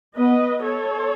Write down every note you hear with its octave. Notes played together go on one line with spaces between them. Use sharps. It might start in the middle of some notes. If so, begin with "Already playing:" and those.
B3 B4 D#5
A4 C#5